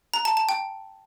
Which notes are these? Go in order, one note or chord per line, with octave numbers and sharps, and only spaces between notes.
A#5
A5
A5
G5